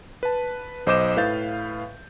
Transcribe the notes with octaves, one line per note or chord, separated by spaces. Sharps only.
B4 A5
B1 C5 D#5 D6 G6 E7
A2 B4 F5 G6 A6